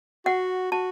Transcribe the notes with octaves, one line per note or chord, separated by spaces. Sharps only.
F#4 F#5
F#4 A5